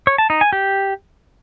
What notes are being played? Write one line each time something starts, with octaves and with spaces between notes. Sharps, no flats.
C#5
A5
D#4
G#5
G4